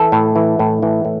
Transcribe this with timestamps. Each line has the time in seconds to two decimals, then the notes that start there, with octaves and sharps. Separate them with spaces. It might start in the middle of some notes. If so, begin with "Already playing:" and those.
Already playing: E3 A4
0.12 A2
0.36 E3
0.59 A2
0.83 E3
1.05 A2